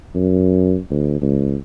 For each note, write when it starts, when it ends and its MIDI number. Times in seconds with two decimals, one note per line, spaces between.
0.15 0.77 42
0.90 1.21 38
1.21 1.55 37